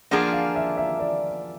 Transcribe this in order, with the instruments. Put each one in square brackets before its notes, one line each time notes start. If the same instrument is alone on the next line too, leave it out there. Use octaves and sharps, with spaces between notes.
[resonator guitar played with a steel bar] F3 A#3 D4 F4 G#4 [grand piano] F#5
[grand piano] F5
E5
E5
D5